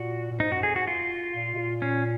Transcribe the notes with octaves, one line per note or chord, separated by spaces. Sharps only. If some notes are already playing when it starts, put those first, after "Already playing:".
Already playing: A#2 F#4
A#2
G#2 D#4
F#2 F#4
F2 G#4
F#4
F4
A#2
B2
A#2
C#4